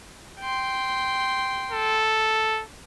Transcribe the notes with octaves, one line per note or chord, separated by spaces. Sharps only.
G5 C6
A4